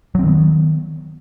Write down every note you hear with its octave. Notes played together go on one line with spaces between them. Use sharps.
D#3 F#3 B3 C4